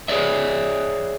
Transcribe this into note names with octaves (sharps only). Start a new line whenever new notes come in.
G#4 C#5 D5 E5